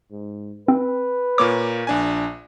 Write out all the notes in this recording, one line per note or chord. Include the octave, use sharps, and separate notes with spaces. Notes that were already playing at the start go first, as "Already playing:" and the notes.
G#2
C4 B4
A#2 A#3 C#5 D6
A#1 D4 G#5